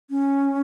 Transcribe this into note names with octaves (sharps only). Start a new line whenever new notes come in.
C#4